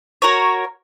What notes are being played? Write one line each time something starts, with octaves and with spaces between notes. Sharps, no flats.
F#4 A#4 C#5